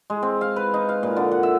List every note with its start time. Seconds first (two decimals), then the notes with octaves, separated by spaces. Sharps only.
0.10 G#3
0.22 C4
0.41 F5
0.56 B4
0.74 D#4
0.89 F5
1.03 A#2
1.16 D3
1.32 F#5
1.43 E5